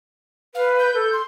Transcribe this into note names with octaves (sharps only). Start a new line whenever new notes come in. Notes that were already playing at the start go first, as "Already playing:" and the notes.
B4 F5
G6
A4
C6